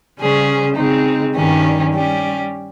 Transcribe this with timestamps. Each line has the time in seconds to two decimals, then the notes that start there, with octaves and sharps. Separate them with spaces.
0.18 C#3 G3 C#4 G#4 C5
0.76 C#3 G#3 C4 D#4
1.35 G2 D#3 G3 C#4 G4
1.92 G3 C#4 G4